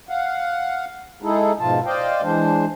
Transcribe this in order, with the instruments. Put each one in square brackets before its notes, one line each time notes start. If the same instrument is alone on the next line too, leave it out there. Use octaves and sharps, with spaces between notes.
[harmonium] F5 F#5
G#3 D#4 E4 G#4 A4
G#2 B2 F3 F4 A5
C5 D5 D#5 F5 G5
E3 G#3 D4 C5